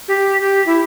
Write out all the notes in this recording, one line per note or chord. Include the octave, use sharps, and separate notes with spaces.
G4
G4
E4